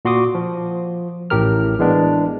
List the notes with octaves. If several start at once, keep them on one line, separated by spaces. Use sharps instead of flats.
A#2 F#4 C6 D6 D#6
F3
A1 A2 G4 A#4 F6
E3 G#3 B3 D4